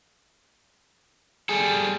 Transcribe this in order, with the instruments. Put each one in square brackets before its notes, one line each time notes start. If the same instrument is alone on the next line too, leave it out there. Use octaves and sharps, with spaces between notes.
[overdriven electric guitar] G3 A4 [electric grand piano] G#4